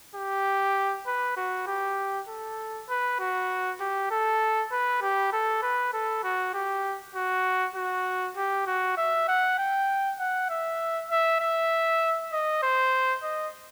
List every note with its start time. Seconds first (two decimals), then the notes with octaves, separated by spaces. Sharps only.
0.15 G4
1.07 B4
1.37 F#4
1.67 G4
2.29 A4
2.89 B4
3.19 F#4
3.80 G4
4.11 A4
4.72 B4
5.02 G4
5.32 A4
5.63 B4
5.93 A4
6.24 F#4
6.54 G4
7.15 F#4
7.76 F#4
8.36 G4
8.67 F#4
8.97 E5
9.28 F#5
9.58 G5
10.20 F#5
10.49 E5
11.10 E5
11.40 E5
12.32 D#5
12.62 C5
13.23 D#5